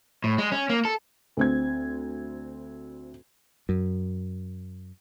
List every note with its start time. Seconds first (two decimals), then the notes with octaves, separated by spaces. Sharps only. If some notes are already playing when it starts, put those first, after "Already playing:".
0.24 A2
0.38 G#3
0.52 C#4
0.69 A#3
0.85 A4
1.37 D2 C4 G#6
3.69 F#2